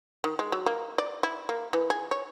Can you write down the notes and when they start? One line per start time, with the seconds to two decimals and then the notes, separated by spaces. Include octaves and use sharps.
0.24 D#3
0.39 G#3
0.52 F#3
0.66 A#3
0.98 D5
1.23 E4
1.49 A#3
1.73 E3
1.90 G#4
2.11 C#5